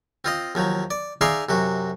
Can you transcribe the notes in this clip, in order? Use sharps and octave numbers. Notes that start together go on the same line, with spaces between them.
C4 F4 D#5
D#2 F3 F#3
D5
D#4 G#4 D5 E5 F5 C6
F#2 C3 F#4